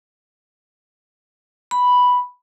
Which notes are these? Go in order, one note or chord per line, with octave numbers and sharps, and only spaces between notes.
B5